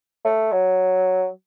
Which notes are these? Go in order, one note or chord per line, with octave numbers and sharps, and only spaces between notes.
A3
F#3